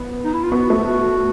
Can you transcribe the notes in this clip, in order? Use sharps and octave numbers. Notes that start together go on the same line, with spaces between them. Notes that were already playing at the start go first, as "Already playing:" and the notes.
Already playing: B3
D#4
E4
F4
B3 F#4
A3